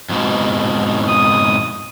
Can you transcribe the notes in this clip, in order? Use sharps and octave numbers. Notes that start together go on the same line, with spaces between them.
F2 G#2 B2
D#6